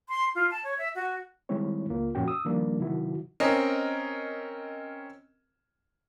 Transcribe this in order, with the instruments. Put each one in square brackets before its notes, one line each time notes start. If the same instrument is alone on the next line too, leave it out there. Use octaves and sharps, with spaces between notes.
[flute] C6
F4
A5
C#5
E5
F#4
[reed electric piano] D#3 G3 G#3 C4 E4 C#5
C#2 A#3 F4
F2 A#2 C#4 F#4 G5
D#6 E6
D#3 F3 G3 A#3 D4
C3 D#3 F#3 E4 F#4
[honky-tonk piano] C4 C#4 A#4 D#5